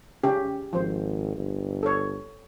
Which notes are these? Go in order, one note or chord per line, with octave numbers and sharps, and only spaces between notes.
C#3 C#4 G4
G#1 F3 C5
G1
A4 C#5